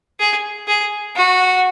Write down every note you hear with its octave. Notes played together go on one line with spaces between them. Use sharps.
G#4
G#4
F#4